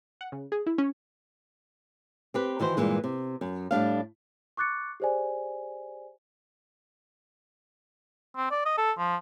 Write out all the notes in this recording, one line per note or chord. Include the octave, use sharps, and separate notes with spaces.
F#5
C#3
G#4
E4
C#4
C4 G4 B4
D#3 E3 F#4 C5
G2 A#2 E3 G#3
C3
F#2
A2 G3 D4 F5
C#6 D6 F#6 A6 C#7
G4 G#4 C5 D5 G#5
C4
D5
D#5
A4
F3